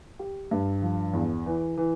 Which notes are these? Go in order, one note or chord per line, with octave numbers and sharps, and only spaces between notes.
G4
G2
F3
E2
E3
E3